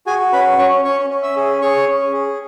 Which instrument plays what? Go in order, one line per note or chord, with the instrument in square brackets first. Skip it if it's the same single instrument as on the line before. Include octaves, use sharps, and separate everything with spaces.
[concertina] F#4 G#4 G#5
C#4 B4 B5
C#4 C#5 C#6
C#4 C#5 C#6
C#4
E5 E6
G#4
G#4 C#5 C#6
C#4
G#4